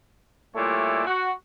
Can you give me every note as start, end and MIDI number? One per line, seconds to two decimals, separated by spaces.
0.55 1.04 46
0.55 1.04 55
0.55 1.04 57
0.55 1.04 64
0.55 1.04 73
0.55 1.04 74
1.06 1.31 66